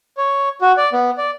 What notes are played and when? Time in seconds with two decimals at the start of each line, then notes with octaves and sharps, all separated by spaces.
0.17 C#5
0.61 F#4
0.77 D5
0.93 B3
1.18 D5